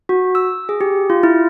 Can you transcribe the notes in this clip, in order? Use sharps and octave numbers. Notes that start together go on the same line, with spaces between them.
F#4
E6
G#4
G4
F4
E4